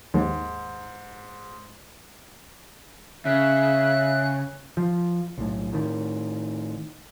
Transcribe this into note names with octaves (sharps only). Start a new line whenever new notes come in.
D#2 G#2
C#3 E5 F#6
F3
B1 A2
A2 D#3